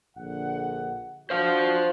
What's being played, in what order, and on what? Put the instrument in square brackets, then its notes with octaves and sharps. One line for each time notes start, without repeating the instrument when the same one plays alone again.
[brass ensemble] A#1 D3 F#5
[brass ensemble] D4 F4 F#4 [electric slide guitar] C5 F5